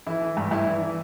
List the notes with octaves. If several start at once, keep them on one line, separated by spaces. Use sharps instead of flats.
E3 E4
E3
G2
G2 E4
E3
E3